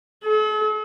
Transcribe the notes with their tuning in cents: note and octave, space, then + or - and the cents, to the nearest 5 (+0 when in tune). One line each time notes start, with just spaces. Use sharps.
A4 -45